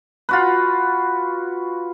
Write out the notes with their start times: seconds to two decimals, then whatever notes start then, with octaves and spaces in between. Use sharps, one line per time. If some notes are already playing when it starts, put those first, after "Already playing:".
0.29 F4 F#4 B4